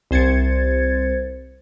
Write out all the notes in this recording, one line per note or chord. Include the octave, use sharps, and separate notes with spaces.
C2 C5 G#6 A6 C#7